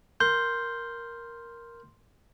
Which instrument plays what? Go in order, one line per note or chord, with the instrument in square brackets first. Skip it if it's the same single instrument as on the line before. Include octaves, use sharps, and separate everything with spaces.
[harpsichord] A#4 [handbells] C6 [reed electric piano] G6